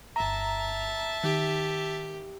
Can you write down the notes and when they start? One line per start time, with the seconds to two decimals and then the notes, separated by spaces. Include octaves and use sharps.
0.16 G1 E5 A5 A#5
1.24 D#3 G4